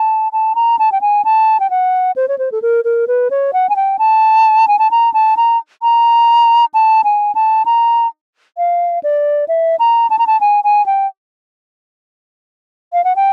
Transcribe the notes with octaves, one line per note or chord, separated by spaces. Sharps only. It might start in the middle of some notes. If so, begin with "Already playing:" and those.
Already playing: A5
A5
A#5
A5
G5
G#5
A5
G5
F#5
C5
C#5
C5
A4
A#4
A#4
B4
C#5
F#5
G#5
G5
A5
G#5
A5
A#5
A5
A#5
A#5
A5
G#5
A5
A#5
F5
D5
E5
A#5
A5
A#5
A5
G#5
G#5
G5
F5
F#5
G5